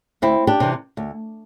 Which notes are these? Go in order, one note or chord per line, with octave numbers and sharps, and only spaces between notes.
D2 C4 E4
D4 G4
C3 E3
D2